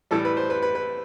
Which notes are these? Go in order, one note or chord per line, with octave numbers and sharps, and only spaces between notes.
A2 E3 G3 A4
B4
C5
B4
B4
B4